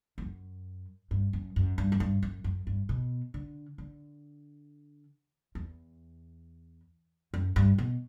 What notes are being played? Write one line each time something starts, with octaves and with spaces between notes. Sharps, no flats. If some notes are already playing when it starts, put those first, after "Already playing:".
E2
F#2
G2
F#2
F#2
G2
F#2
G2
F#2
F#2
G2
B2
D3
D3
E2
F#2
G2
B2